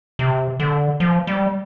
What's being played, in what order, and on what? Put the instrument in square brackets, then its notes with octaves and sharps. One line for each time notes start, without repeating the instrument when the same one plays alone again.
[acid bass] C3
D3
F3
G3